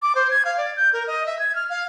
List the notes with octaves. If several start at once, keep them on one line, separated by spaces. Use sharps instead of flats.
D6
C5
G#6
F5
D5
G6
A#4
D#5
E5
G#6
F6
F5